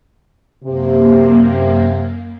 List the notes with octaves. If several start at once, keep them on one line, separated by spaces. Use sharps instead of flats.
F#2 C3 A#3